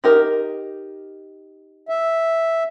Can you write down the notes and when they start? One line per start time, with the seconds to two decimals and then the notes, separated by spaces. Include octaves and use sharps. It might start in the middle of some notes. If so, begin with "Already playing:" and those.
0.04 D#4 G4 A#4
1.89 E5